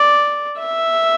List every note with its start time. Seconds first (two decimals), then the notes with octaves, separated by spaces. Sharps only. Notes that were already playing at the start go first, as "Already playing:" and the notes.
Already playing: D5
0.59 E5